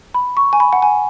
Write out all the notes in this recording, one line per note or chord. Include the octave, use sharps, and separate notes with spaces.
B5
C#6
G#5
B5
F#5
G#5